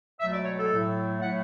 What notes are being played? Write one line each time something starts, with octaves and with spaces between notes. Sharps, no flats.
C#2 B2 F#3 A3 E5
D5
C#5
A4
A2 F#3 A3
A2 F#3 A3 F#5